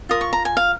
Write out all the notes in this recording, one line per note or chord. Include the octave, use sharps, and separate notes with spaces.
F4 A#4 D#6
C#6
A#5
G#5
F5